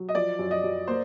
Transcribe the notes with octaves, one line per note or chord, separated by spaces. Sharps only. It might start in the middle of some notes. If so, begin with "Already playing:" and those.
Already playing: F#3
D#5
F3 D5
F#2
D#5
F#2
A#3 C5